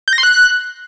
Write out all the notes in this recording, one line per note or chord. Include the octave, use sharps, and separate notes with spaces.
G6
A#6
C6
F#6